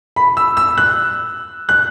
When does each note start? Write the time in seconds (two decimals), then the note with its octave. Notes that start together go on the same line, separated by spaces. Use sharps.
0.16 B5
0.37 E6
0.57 E6
0.78 F#6
1.69 F#6